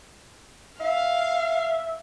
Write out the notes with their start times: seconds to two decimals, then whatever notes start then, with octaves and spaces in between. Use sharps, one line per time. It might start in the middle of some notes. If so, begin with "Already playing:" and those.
0.80 E5 F5